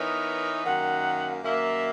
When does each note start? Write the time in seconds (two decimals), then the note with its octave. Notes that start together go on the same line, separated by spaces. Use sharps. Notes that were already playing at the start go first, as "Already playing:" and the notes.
Already playing: E3 B3 D#4 A#4 C#5
0.64 F#2 D#3 A#3 F#5
1.43 F#2 D#3 A#3 E5